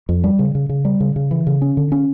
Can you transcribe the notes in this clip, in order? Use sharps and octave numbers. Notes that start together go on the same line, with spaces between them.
F2
G3
C#3
C#3
C#3
G3
C#3
C#3
E3
C#3
C#4
D3
C#4